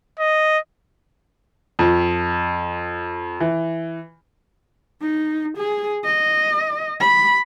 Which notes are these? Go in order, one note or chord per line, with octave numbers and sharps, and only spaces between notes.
D#5
F2
E3
D#4
G#4
D#5
B5